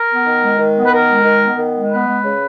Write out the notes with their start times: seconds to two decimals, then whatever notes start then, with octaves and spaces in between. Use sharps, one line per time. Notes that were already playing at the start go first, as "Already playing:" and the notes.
Already playing: A#4
0.10 B3
0.26 D#3
0.42 G#3
0.59 D#3
0.76 B3
0.85 B4
0.92 D#3 A#4
1.08 G#3
1.25 D#3
1.42 B3
1.58 D#3
1.75 G#3
1.91 B3 B4
2.08 G#3
2.25 C#3